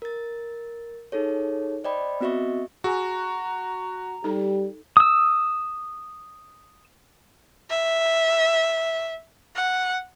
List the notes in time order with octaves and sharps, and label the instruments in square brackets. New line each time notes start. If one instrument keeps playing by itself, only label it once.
[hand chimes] A#4 A6
D#4 G#4 A4 C#5
C5 D5 D#5 G5 B5
B3 C4 F#4 D#5 E5 C#6
[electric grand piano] F#4 [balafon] G#4 G#5 [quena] A#5
[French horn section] G3 G4 [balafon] D#4 A4
[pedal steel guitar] D#6 E6
[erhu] E5
F#5